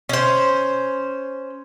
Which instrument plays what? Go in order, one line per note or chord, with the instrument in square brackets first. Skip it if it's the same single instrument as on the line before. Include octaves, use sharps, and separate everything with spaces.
[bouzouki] C#4 C5